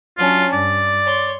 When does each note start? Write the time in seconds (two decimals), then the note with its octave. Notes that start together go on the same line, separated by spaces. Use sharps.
0.18 F#3 C#4 D4 F4
0.53 G2 D5
1.05 C#5 C6